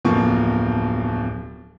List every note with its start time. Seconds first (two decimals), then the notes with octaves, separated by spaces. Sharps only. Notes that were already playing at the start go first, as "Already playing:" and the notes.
0.05 D1 F2 B2 F3 A#3 C#6